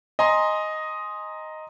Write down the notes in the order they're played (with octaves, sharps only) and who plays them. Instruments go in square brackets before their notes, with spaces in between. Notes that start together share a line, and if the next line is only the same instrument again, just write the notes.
[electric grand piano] D#5 G#5 A#5 C6